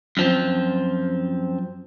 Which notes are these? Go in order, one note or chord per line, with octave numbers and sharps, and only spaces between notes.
F#2 F3 C4